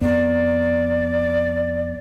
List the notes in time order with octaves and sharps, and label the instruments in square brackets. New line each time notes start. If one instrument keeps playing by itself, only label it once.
[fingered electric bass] F2 B3 [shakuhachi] D5